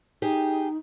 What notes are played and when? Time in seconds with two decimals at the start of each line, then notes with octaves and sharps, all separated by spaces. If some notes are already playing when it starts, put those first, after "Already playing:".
0.22 D#4 G4 G#4